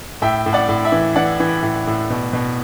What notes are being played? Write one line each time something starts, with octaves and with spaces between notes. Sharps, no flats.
A2 E5 G5
A2
D5 F#5
A2
E5
E3
E3 D5 F#5
E3
A2
A2
B2
B2